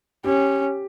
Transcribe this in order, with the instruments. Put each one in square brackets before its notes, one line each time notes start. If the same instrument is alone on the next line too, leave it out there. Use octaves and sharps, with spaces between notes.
[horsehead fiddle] C#4 [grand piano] G4